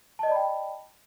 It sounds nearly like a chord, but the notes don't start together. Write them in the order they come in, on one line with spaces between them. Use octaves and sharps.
A5 D#5 D5 B5 G5